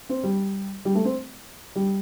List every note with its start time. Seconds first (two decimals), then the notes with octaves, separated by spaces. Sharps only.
0.09 C4
0.23 G3
0.85 G3
0.95 A3
1.05 C4
1.76 G3